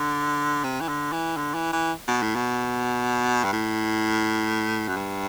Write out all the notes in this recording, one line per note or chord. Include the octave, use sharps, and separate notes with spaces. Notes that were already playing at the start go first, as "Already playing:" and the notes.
Already playing: D3
C3
E3
D3
E3
D3
E3
E3
B2
A2
B2
G2
A2
F#2
G2